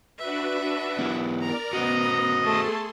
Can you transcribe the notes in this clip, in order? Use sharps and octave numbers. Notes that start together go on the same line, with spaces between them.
D4 F#4 B4 E5
B3 E4 G4
A#4 D5 A#5
B3 F#4 A#4 C5 D#5
A3 G#4 A4 A5 C6